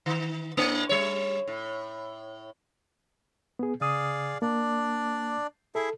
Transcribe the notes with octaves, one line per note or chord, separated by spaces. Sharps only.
D#3
A2 A#3 D4
G3 C#5
A2
B3 G#4
C#3 G#4 D5 F5 D#6
A#3 D4 D5
E4 G#4 A4 E5